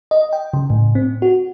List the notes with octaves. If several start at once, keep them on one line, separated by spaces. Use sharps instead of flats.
D#5
G5
C#3
A2
C4
F#4